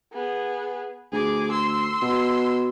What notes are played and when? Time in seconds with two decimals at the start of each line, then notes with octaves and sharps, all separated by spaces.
0.13 B3 G#4
1.13 D2 G#4 D6
1.52 C6 E6
2.02 B2